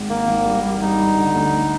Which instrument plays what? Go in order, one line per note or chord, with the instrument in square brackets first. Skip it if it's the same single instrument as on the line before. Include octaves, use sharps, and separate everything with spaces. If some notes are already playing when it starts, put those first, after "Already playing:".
Already playing: [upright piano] G#1 G#2
[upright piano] D#3 [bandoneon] A#3
[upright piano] G#1
G3
G3
[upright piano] G3 [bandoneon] D#4
[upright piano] G3
D3
D2